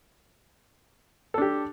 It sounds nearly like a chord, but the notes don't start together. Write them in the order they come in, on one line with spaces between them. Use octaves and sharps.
A4 D4 G4